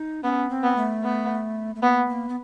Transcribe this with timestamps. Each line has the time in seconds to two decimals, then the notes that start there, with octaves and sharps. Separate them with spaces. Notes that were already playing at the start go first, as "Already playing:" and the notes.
Already playing: D#4
0.23 B3 C#4
0.50 C4
0.63 B3
0.77 A3
1.04 B3
1.75 A3
1.82 A#3 B3
2.06 A3
2.09 A#3
2.29 B3